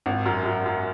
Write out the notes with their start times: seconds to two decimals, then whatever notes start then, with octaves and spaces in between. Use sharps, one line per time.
0.06 G#1
0.26 F#2
0.45 F#2
0.66 F#2